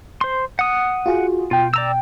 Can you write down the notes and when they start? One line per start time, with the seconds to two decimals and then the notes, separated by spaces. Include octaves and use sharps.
0.21 C5 C6
0.59 F#5 D#6
1.06 F4 F#4 G#4
1.51 B2 F4 G5
1.74 D5 A#5 E6